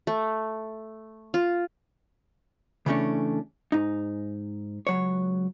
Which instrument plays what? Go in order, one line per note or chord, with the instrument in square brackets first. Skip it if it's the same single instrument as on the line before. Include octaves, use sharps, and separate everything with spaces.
[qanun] A3
F4
[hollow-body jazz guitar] C#3 E3 G3 A3 C#4 D4
G#2 D#4
C#2 F#3 C#5